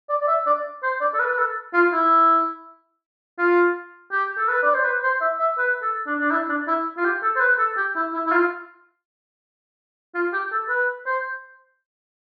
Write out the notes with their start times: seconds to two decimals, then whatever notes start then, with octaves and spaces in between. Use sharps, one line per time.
0.09 D5
0.21 D5
0.28 E5
0.46 D5
0.83 C5
1.01 D5
1.14 A4
1.19 B4
1.30 B4
1.38 A4
1.74 F4
1.93 E4
3.39 F4
4.12 G4
4.38 A4
4.48 B4
4.63 D5
4.74 C5
4.85 B4
5.04 C5
5.21 E5
5.39 E5
5.58 B4
5.82 A4
6.07 D4
6.20 D4
6.31 E4
6.49 D4
6.67 E4
6.97 F4
7.05 G4
7.22 A4
7.36 C5
7.41 B4
7.59 A4
7.77 G4
7.96 E4
8.14 E4
8.27 E4
8.32 F4
10.14 F4
10.33 G4
10.52 A4
10.70 B4
11.06 C5